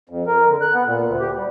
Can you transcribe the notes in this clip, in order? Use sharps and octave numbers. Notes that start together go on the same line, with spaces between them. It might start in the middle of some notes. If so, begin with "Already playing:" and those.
F2
A#4
D3
F#6
B3
A#2
D2
G4
G3